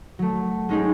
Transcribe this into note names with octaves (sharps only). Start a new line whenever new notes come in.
F#3 A3
G#3 C#4 D#4 G4 G#4